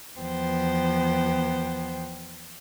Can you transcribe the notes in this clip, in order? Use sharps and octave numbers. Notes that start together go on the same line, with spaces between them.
E2 F3 B3 C5 G5